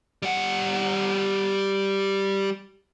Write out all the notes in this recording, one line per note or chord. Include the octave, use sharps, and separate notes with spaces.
G3 F#5